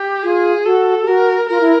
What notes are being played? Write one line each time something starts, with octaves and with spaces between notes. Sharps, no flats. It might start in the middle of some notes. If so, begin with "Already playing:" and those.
Already playing: G4
F4 G#4
F#4 A4
G4
F#4 A#4
F4 A#4
E4